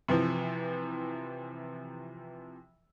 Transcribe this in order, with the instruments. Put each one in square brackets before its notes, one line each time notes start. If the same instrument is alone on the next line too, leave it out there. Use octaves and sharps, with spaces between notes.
[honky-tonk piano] C3 E3 F3